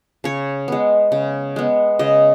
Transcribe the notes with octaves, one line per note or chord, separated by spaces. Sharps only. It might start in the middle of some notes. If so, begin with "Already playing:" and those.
C#3 C#5
G#3 B3
C#3
G#3 B3
C#3 D#5